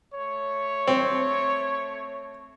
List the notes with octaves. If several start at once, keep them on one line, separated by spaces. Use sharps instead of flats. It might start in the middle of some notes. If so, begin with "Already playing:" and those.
A3 C#5
C4